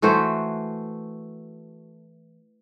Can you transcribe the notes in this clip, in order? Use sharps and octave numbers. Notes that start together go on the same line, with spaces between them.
E3 A3 F#4 C5